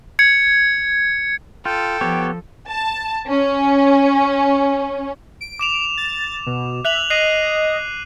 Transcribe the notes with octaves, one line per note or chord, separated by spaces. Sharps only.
G#6 C#7
F4 A4 G5
F3 B3 G4 C#5
A5
C#4
D7
D6 E7 F7
A6
B2
E5 F#6 F7 F#7
D#5 F#6 C7 D#7